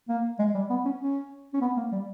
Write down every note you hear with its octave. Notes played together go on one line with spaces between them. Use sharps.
A#3
G#3
G3
B3
C#4
C#4
C#4
B3
A#3
G3